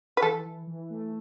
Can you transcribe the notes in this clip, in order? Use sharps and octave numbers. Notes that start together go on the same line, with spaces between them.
B4
E3 A4
E3
E3
A3